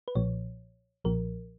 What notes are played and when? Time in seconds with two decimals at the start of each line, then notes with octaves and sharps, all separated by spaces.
0.08 B4
0.15 B1 A#2 F3 C#5
1.04 B1 A#2 F3 A#4